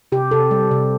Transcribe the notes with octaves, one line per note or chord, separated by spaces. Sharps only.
C3 G4
C3 A4
G3
C3